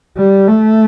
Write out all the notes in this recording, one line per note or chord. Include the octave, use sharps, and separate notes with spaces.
G3
A3